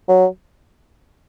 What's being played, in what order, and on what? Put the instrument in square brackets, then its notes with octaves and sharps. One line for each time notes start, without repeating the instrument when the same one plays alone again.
[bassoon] F#3